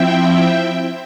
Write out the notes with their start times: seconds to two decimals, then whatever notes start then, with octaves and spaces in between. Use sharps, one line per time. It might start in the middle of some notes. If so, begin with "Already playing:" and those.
Already playing: F3 C4 E4 E5 G5